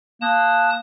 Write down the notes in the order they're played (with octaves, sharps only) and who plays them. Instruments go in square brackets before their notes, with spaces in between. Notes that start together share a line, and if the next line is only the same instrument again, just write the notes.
[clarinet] A#3 [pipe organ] A5 D#6 F#6